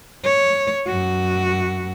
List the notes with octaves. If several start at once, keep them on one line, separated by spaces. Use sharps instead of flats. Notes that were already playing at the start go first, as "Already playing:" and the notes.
C#5
F#2 F#4